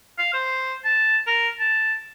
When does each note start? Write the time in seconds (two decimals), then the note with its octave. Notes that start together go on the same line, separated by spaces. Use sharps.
0.19 F5
0.33 C5
0.85 A5
1.27 A#4
1.60 A5